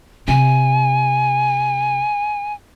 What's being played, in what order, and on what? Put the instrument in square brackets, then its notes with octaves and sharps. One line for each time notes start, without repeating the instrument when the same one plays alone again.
[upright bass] C3 [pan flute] G#5